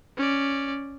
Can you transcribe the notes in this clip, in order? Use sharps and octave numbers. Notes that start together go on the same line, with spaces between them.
C#4 D5